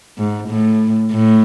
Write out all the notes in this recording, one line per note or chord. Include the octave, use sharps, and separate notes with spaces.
G#2
A2
A2